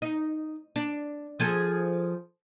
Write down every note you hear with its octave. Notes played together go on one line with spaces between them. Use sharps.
D#4
D4
F3 G#4 A4